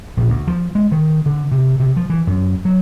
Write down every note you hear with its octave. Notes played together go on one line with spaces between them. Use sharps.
A#1
D2
F3
G#3
D#3
D3
C3
C3
F3
E3
F#2
F#3